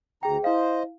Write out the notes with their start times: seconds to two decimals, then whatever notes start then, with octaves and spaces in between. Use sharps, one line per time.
0.23 D2 G#4 G5 A#5
0.44 E4 C5 D#5 F5